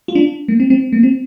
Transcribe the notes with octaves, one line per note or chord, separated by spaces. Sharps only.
F4
D4
A#3
C4
C4
A#3
C4